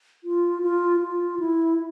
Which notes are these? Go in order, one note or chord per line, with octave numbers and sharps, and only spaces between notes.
F4
F4
F4
E4